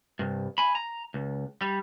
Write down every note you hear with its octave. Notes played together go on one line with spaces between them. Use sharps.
C2 G2
G#5 B5
A#5
C#2
G3